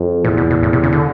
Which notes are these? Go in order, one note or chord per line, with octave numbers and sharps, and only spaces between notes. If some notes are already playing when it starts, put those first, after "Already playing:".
Already playing: F2
E2 A#2
B2
B2
A2
C3
C#3
D3